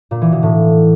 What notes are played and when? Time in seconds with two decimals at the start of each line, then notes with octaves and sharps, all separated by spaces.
0.11 A#2
0.22 E3
0.32 B2
0.43 A2